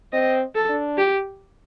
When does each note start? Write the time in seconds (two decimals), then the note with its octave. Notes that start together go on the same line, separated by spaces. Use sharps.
0.13 C4 D#5
0.55 A4
0.69 D4
0.98 G4